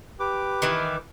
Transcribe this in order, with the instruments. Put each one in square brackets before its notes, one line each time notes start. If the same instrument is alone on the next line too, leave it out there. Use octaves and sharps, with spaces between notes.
[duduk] G4 [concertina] B4 D6
[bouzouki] D#3 E3